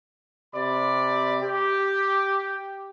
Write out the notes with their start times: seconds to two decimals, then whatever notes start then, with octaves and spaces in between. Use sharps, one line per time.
0.55 C3 D5 B5
1.42 G4